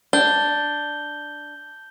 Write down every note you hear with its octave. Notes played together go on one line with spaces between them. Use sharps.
D4 G6 G7